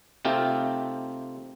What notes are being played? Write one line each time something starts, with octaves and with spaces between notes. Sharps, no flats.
C3 A3 C4 D#4 F4 G4